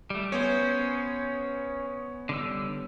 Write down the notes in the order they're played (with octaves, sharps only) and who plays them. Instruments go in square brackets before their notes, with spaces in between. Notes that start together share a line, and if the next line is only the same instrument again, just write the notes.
[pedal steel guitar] G3 A3
[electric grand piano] B3 C#5 [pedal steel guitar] C#4 G#4 C5
[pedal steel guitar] D3 G3 E6